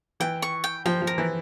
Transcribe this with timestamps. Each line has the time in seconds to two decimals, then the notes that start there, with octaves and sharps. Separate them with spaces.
0.20 E3 G5
0.42 C#6
0.64 G5
0.86 F3 G5
1.02 F3
1.07 A#4
1.18 E3